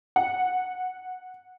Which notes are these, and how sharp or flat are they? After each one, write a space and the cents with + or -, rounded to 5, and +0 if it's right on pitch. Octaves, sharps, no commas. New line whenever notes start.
F#5 -10